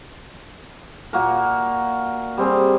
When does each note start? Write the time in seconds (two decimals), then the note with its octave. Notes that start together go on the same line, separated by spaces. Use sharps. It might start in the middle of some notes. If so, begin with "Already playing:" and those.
1.13 A#2 A#3 F#4 A#4
2.37 G3 C4 G#4